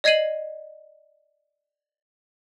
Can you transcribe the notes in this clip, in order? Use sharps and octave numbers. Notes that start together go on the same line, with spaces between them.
D5 D#5 G#6 C7 D#7 F#7